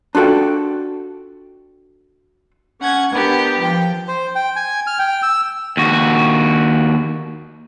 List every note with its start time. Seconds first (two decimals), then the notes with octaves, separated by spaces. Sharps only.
0.15 D4 F4 F#4 A4 G5
2.81 C#4 F#5 G#6
3.14 B3 D4 G4 A#4
3.60 F3 G5
4.08 C5
4.35 G5
4.56 G#5
4.87 F6
4.99 G5
5.23 E6
5.77 D#2 F#4